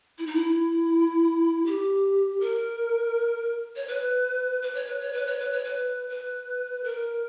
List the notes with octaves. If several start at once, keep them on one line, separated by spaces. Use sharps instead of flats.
E4
D#4
E4
G4
A#4
C#5
B4
B4
C#5
B4
C#5
B4
C#5
B4
C#5
B4
B4
A#4